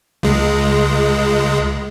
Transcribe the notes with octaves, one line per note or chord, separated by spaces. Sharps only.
C#2 G#3